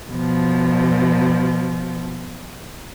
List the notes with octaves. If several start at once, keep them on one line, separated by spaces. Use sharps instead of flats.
B2 F3